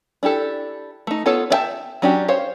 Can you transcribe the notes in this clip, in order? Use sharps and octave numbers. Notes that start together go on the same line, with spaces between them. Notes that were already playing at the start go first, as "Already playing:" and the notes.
D4 E4 G4 A4
A3 D#4
B3 F4 A4 C#5
D4 E5 G5 A5
F#3 C#4 D4 F#4 G4
C5 C#5 F5